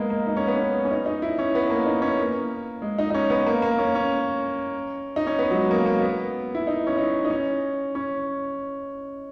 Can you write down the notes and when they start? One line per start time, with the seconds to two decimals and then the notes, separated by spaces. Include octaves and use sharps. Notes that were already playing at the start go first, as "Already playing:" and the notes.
Already playing: G#3 A#3 B3
0.10 A#3
0.27 D#4
0.36 C#4
0.47 B3
0.57 C#4
0.85 C#4
0.91 D#4
1.06 D#4
1.22 E4
1.39 C#4
1.55 B3
1.70 A#3
1.86 D#4
2.02 C#4
2.19 A#3
2.82 G#3
2.98 D#4
3.10 D#4
3.14 C#4
3.30 B3
3.46 A#3
3.62 A#3
3.78 C#4
3.95 C#4
5.16 D#4
5.27 C#4
5.39 B3
5.51 F#3
5.54 G#3
5.71 A#3
5.86 A#3
6.02 B3
6.55 E4
6.67 D#4
6.87 C#4
6.98 D#4
7.25 D#4
7.30 C#4
7.95 C#4